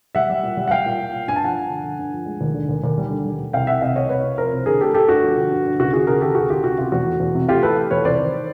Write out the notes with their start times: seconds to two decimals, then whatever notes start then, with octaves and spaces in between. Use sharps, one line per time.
0.15 G3 E5 F#5
0.29 G3
0.43 A#2
0.57 G3
0.68 F#5
0.71 G3 F5 G5
0.86 A#2
1.00 A#2
1.13 A#2
1.28 G2 G#5
1.36 A5
1.42 F3 F#5 G#5
1.57 F3
1.70 D3
1.84 D3
1.99 G2
2.12 F3
2.26 G#3
2.41 D#2
2.54 D3
2.69 D#2
2.84 D#2
2.98 G3
3.11 D3
3.25 G3
3.40 D#2
3.53 C2 F5 G5
3.67 C2 E5 F#5
3.82 C3 D#5 F5
3.96 C2 C#5 D#5
4.09 C2 B4 C#5
4.24 C3
4.38 F3 A#4 C5
4.53 C2
4.66 D3 G#4 A#4
4.80 A3 G4 A4
4.94 A3 G4 A4
5.08 G2 F#4
5.23 F3
5.37 D3
5.51 G2
5.65 D3
5.80 C#2 F#4
5.93 D#3 F#4 G#4
6.07 C#2 G#4 A#4
6.21 D#3 G4 A4
6.35 C#2 F#4 G#4
6.49 D#3 F4 G4
6.64 C#2 F#4
6.78 C3 F4
6.92 E2 F#4
7.05 A3
7.20 E2
7.35 C3
7.48 A3 F4 G4
7.62 E3 A4 B4
7.77 A3
7.91 E2 B4 C#5
8.04 C2 C5 D5
8.19 D#3